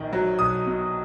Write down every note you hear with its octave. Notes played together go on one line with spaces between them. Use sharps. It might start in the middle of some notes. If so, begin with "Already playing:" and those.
Already playing: A#1 D#3
F#3
B1 D#6
B2